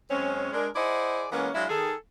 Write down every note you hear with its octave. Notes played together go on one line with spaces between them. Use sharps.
F#2 G#3 C4 C#4
G#3 D4 A#4
E4 G#4 C5 D5 D#5 F#5
E3 G#3 A#3 B3 C#4
F#3 G#3 D4 E4 F4
D#3 G#4 A4